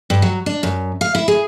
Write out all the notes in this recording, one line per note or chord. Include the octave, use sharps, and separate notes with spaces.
G2
F#3
D4
F#2
F5
E4
G#4